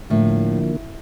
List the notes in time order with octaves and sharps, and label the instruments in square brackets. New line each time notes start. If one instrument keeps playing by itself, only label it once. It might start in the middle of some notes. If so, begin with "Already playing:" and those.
[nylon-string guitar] A2 [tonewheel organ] D3 F3 A#3